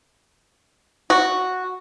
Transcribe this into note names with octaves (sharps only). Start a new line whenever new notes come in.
F#4